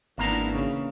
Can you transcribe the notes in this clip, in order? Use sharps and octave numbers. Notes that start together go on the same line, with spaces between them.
G#1 E2 A#3 B3 D4 E4 A#5
C#3